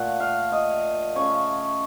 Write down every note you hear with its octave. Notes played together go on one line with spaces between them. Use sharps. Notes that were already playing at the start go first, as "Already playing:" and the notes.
Already playing: A#2 A3 F#5
F5
D#5
C#3 A3 C#5